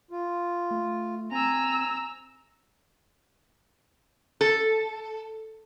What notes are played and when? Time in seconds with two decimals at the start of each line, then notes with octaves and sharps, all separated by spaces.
0.11 F4
0.71 A3
1.32 C4 G#5 A#5 E6
4.41 A4